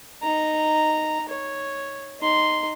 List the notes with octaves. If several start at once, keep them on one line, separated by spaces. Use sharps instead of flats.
D#4 A#5
C#5
D#4 C6